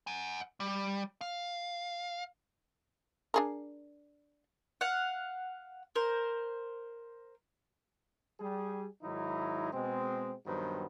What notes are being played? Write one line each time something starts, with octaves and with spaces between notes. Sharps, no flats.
F#5 G#5
G3
F5
D4 G#4 A#4
F5 F#5
A#4 C5
G3 G#4
G#2 D#3 F#3 D#4 E4
B2 G#3 C4
A#1 G2 D#3 F#3 B3 C5